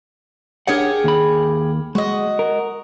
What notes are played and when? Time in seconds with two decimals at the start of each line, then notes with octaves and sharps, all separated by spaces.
0.67 D4 G4 G#4 A#4 C#5 F#5
1.04 D#2 B5
1.95 G#3 F#4 D#5
2.39 A#4